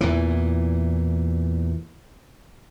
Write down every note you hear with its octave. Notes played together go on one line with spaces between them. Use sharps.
E2 A#2 E3